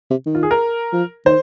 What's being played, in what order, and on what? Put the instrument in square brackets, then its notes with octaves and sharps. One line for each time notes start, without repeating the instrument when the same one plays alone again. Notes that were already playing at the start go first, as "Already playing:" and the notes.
[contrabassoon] C3
D#3
[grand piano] F4
G#4
A#4
[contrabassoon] F3
[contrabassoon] D#3 [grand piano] C5